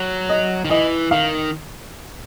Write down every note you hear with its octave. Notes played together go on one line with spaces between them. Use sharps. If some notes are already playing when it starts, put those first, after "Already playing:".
Already playing: F#3
D#5
D#3
E3 D#5
D#3 F5